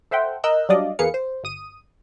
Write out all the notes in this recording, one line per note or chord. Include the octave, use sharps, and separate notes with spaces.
A4 C5 E5 F#5 G5
A#4 D#5 E6 F#6 G6
F#3 G3 D4 D5 D#5 F5
E2 A#3 G#4 B4 F5 C#7
C5
G1 D#6 D#7